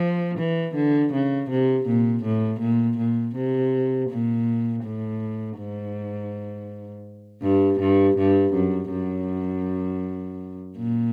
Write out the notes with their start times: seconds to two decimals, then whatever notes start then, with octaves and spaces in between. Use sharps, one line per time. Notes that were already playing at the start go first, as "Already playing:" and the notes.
Already playing: F3
0.38 E3
0.75 D3
1.13 C#3
1.50 C3
1.87 A#2
2.24 A2
2.60 A#2
2.98 A#2
3.35 C3
4.10 A#2
4.83 A2
5.58 G#2
7.43 G2
7.80 G2
8.17 G2
8.54 F#2
8.91 F#2
10.77 A#2